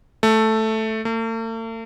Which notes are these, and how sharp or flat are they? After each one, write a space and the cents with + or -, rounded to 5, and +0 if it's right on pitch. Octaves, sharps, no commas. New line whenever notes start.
A3 +0
A3 +45